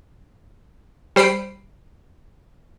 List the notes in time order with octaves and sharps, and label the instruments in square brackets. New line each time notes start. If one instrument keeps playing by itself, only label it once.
[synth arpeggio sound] G3 C5 B5 C7 D7